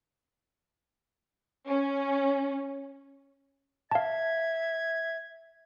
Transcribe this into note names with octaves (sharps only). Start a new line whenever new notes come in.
C#4
E5 F5 A5 G#6